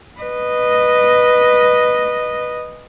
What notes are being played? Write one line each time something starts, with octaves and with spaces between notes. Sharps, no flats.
B4 D#5